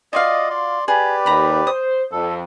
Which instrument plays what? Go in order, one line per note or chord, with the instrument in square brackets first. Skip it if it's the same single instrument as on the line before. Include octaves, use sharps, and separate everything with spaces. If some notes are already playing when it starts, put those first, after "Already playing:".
[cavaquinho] F4 F#4 F5 [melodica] D5 D#5
[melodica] D5 C6
[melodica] G4 B4 D5 [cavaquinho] G#4
[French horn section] D#2 [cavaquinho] A#5 B5
[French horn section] C5 [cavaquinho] D#6
[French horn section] F2 [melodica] A4